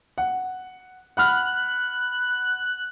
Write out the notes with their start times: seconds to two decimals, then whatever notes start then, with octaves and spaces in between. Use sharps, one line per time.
0.18 F#5
1.17 F#5 B5 F6 F#6